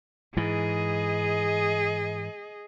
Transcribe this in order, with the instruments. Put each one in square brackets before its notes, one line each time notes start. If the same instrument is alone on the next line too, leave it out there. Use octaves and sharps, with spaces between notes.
[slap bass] G#2 E3 [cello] G#4 D#5